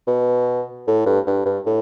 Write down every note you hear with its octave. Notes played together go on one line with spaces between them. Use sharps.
B2
A2
G2
G2
G2
A2